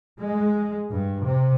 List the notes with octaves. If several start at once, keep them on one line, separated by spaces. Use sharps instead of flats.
G#3
G2
C3